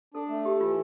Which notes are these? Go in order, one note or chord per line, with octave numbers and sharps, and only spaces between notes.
D4 A4
A3
G4 A4
E3 F4